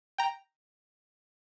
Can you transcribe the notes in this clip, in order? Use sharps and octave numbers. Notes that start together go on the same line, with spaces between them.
G5 A#5